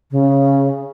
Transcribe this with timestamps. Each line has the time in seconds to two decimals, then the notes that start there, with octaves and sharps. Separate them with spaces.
0.11 C#3